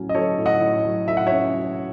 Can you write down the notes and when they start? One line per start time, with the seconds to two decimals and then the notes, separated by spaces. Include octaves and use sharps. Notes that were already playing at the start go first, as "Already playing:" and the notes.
Already playing: A2 F#3 C#4
0.09 D#5
0.15 F#3 A4 C#5
0.38 A2
0.46 D#5 F#5
0.61 A2
0.85 F#3
1.08 A2 E5
1.17 F#5
1.27 C#4 C#5 E5
1.54 F#3